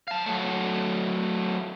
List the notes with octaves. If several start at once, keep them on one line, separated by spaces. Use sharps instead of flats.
F5 A5
F#3 A3